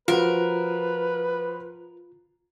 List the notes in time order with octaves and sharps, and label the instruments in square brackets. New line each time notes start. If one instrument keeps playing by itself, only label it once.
[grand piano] F3 F#4 [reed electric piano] F4 [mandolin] A#4 [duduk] B4